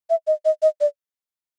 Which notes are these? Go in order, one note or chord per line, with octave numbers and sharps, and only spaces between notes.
E5
D#5
D#5
D#5
D5